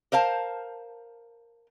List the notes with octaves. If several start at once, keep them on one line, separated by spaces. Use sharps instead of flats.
A#4 C5 F5 A5